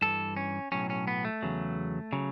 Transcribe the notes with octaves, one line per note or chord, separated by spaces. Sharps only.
G2 E3 A4
C#4
B1 A2 F#3 C#4
C#4
B3
A3
E2 C#3 F#3
C#3 F#3